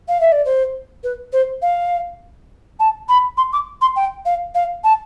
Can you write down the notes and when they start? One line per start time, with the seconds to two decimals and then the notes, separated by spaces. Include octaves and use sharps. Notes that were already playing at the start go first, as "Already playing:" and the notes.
0.08 F5
0.20 E5
0.32 D5
0.44 C5
1.03 B4
1.32 C5
1.62 F5
2.79 A5
3.08 B5
3.37 C6
3.52 D6
3.81 C6
3.96 G5
4.25 F5
4.54 F5
4.84 A5